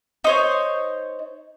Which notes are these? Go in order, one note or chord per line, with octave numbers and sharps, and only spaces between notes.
D#4 C5 C#5